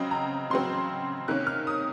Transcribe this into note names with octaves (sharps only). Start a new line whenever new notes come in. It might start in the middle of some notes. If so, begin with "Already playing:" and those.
Already playing: C#3 F#3 C4 D#5
A#5
C#3 F#3 C4 C6
C3 D#3 A#3 C#4 F#6
F6
D#6